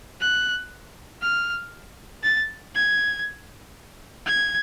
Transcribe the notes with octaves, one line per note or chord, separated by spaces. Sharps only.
F#6
F6
A6
G#6
G#6